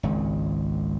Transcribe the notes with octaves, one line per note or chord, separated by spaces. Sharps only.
G#1 C#2